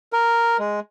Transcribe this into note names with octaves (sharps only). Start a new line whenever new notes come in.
A#4
G#3